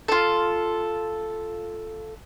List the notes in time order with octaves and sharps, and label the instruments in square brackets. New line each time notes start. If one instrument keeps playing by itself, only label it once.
[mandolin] F4 A4